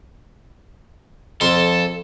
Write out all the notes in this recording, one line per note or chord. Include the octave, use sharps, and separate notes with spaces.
F2 F4 A4 C6